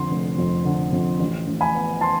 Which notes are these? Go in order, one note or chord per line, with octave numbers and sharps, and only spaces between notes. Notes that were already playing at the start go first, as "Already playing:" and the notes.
Already playing: F2 D3 C6
F1
F2
D3
F2
A1
A1
G#5 B5
B3
A5 C6